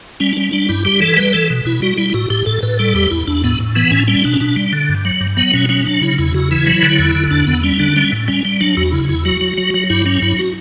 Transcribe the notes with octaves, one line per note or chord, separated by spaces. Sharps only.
G3 C#4
D4
G3 C#4
G3 D4
G2 E4
G3 G4
E3 A4
G3 B4
E3 A4
B2
B2 E4
G3 F#4
G3 E4
E4
A2 F#4
A2 G4
A2 A4
A2 B4
G3 A4
E2 G4
E2 E4
E2 D4
A2 B3
A2
E3 B3
A2 C#4
G3 C#4
B2 D4
C#4
B2 D4
G3
D3
G2
F#3
G2
F#3 B3
B2 C#4
F#3 C#4
F#3 D4
C#3 E4
E2 E4
C#3 F#4
E3 E4
F#3
D3
E2
D3
E2 D4
E2 B3
G3 C#4
D3 D4
G3 C#4
A2
G3 C#4
G3
F#3 D4
E2 F#4
C#3 E4
E2 E4
F#3 F#4
F#3
F#3
F#3
G2 E4
F#3 C#4
G2 E4
F#4